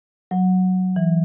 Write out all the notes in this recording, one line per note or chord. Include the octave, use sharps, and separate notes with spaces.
F#3
E3